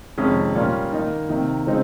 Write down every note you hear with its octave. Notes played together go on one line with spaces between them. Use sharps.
F2 C3 D#3 G#3 C#4
A#2 G3 A#3 C#4
D#3 A#3 D#4
C3 D#3 A#3 D#4
C#3 G#3 C4 D#4